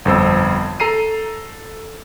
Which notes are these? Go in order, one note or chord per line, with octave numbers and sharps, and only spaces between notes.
G1 F2 C5 E6
A4 A#5 C7 D#7